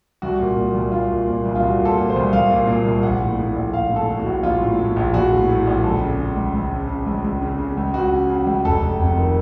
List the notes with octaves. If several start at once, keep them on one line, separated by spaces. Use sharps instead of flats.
C2 F#4
A#2
A#2
C2
C2 F4
A#2
A#2
C2
F4
C2 F#4
A#2
A4
A#2
C5
C2
C2 F5
A#2
A#2
C2
A#1 F#5
A2
A2
A#1
A#1 F5
A2
A4
A2
F#4
A#1
A#1 F4
A2
A2
A#1
A#1 F#4
A2
A2
A#1
C#2 A4
C#3
C#3
C#2
C#2
C#3
C#3
C#2
C#2
C#3
C#3
C#2
C#2 F#4
C#3
C#3
C#2
F1 A4
F1
F2
D#3